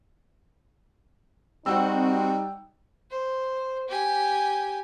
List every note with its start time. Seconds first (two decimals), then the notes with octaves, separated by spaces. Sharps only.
1.66 G3 C4 D#4 F#4 F#5 G5 E6
3.11 C5
3.89 G4 G#5